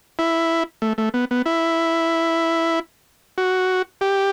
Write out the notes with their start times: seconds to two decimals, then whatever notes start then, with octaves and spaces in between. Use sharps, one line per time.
0.19 E4
0.82 A3
0.98 A3
1.14 B3
1.31 B3
1.46 E4
3.38 F#4
4.01 G4